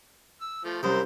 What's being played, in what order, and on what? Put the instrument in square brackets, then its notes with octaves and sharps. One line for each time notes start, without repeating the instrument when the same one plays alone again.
[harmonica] E6
F3 A3
[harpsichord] C2 F#2 [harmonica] A#4 C5